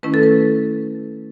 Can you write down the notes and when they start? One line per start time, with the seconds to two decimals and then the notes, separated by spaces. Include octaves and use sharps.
0.03 D#3 A3 C#4 E4 B4
0.14 A4
0.23 B4